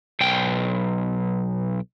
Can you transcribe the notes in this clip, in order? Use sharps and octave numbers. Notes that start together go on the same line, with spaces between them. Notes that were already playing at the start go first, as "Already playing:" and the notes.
B1 G5